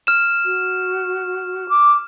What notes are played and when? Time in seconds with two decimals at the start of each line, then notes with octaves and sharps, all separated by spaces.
0.07 F6 E7
0.45 F#4
1.69 D6